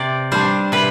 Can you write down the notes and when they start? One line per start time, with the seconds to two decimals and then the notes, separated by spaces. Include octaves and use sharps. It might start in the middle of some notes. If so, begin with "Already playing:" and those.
Already playing: C3 D5
0.32 G3 D4 C5
0.72 C3 B4